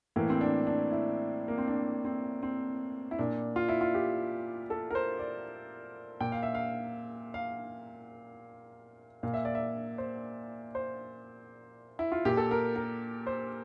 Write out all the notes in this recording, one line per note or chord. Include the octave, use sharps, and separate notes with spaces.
A2 E3 A#3
C4
D4
D4
E4
A#3
C4
D4
C4
C4
E4
A#2 D4
F4
E4
F4
G4
A4
A#4
C5
D5
A#2 G5
F5
E5
F5
F5
A#2 F5
E5
D5
E5
C5
C5
E4
F4
A#2 G4
A4
A#4
A#4
C5